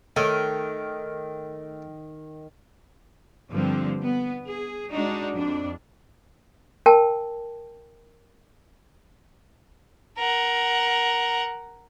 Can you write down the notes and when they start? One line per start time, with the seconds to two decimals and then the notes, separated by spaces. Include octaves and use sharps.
0.16 D#3 A3 C#5
3.50 G2 D3 F3 G3 A#3 C4
4.02 B3
4.45 G#4
4.90 G#3 D4 D#4 F#4
5.34 F2 D4
6.86 A#4 G5 A5
10.18 A#4 F#5